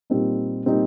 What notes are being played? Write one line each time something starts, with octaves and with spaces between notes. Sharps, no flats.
A#2 G3 C4 D#4
A#2 G3 C4 D#4